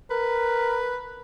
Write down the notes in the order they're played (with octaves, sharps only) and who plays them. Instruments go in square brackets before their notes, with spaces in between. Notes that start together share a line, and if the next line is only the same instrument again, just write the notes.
[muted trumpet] A#4 [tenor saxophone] B4